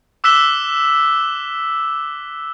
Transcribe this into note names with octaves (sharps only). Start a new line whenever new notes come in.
D6 E6 F#6 B6 E7 G7